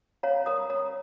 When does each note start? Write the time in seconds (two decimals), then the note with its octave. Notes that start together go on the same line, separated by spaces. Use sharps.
0.23 C#5 F5 A#5
0.46 A#4 A#5 D#6
0.70 C#5 A#5 D#6